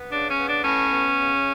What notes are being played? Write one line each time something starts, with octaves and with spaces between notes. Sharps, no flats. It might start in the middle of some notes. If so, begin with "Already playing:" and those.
Already playing: B3
C#3 D4
C#4
B3
D4
A2 C#4
B3
C#3